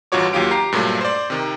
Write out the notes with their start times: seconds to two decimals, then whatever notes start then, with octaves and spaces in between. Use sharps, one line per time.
0.12 A1 G2 F4 F#4 C#5 D6
0.33 D#2 F#3 F4 G4 F5 D7
0.51 G4 A#5 C7
0.72 G2 A#2 F#3 A3
1.01 C5 D5
1.30 C3 D#3